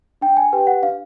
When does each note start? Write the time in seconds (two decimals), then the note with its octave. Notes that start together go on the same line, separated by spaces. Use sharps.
0.21 D4 G5
0.37 G#5
0.53 G4 B4 G5
0.67 F#5
0.82 D4 F5